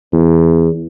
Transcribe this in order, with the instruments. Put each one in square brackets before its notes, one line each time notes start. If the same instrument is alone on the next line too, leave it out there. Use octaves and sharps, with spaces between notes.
[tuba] E2